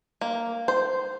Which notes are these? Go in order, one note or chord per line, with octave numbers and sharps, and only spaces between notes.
A#3
C5